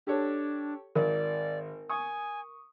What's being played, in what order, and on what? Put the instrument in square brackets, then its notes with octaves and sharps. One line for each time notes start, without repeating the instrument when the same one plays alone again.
[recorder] D4 [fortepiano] G4 A4 C#5
[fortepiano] G#1 [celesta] A#4 [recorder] D5
[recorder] G#5 [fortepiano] C#6 D#6